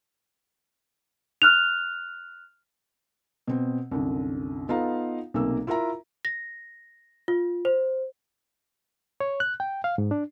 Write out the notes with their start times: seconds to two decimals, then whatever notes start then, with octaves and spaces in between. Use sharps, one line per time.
1.42 F6 F#6 F7
3.48 B2 C4
3.91 C2 F#2 D3
4.69 B3 D#4 F4 A4 F5 A#5
5.34 B1 C3 A#3 E6
5.67 E4 F4 A#4 E5 A#5
6.25 A#6
7.28 F4
7.65 C5
9.20 C#5
9.40 F#6
9.60 G5
9.84 F5
9.98 G#2
10.11 D4